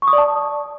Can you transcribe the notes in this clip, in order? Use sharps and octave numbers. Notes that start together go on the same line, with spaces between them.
C#6
D#6
D5
A5